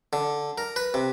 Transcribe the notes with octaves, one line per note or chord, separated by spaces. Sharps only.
D3
A#4
B4
C3